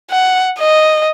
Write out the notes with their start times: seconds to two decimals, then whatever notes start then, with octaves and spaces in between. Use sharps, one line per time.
0.11 F#5
0.59 D#5